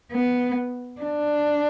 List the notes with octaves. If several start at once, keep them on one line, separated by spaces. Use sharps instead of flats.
B3
D4